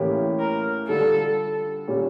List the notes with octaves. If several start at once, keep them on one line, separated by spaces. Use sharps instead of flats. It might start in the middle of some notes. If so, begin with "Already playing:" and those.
Already playing: A2 E3 A#3 C#4 G4
A#4
D3 G3 D4 F4 A4
A#2 G3 C#4 G4